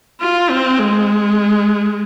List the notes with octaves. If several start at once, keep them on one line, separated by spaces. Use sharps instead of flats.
F4
C4
G#3